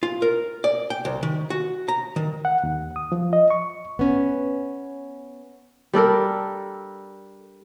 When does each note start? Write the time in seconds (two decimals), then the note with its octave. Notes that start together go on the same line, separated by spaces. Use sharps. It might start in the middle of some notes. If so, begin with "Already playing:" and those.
0.03 F4
0.22 A#4
0.64 D5
0.90 G5
1.05 C2
1.23 D#3
1.50 F#4
1.88 A#5
2.16 D#3
2.45 F#5
2.63 D#2
2.96 D#6
3.12 F3
3.33 D#5
3.50 C#6
3.99 B3 C#4
5.94 G3 D4 A4 A#4